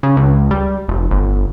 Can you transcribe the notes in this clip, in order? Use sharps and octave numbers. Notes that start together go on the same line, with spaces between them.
C#3
C#2
G3
F1
G1